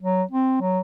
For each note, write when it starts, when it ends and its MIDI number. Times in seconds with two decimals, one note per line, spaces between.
0.02 0.23 54
0.31 0.57 60
0.62 0.80 54